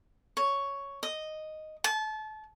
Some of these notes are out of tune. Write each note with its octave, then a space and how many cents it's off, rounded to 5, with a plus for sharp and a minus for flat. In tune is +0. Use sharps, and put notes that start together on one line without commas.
C#5 +5
D#5 -5
A5 -30